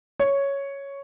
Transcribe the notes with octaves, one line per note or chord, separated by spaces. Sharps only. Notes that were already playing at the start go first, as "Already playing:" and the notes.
C#5